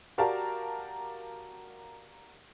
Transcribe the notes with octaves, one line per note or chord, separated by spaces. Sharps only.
F#4 G4 A#4 D5 F5 A5